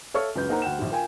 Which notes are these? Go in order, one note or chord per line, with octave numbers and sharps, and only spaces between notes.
A4 C#5 E5 F5 C#6 F6
C#2 F#2 B4 G6
A#3 D#4 A#4 C5 F#5 A#5
D2 F#5 G5 E7
A#1 D#3 G3
F4 A#4 G5 G#5